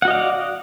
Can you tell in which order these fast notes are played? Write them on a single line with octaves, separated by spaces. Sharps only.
F#5 F#4 D#5 F5 D5